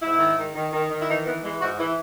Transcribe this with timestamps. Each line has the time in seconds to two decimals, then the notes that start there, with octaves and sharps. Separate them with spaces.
0.02 G#2 E4
0.19 D#3
0.37 D#3
0.55 D#3
0.73 D#3
0.91 D#3
1.00 E4
1.09 E3 D#4
1.26 E3 B3
1.44 E3 G#3
1.61 G#2 F#4
1.78 E3 E4